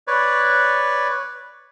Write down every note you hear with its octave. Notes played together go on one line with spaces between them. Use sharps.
B4 C#5 D5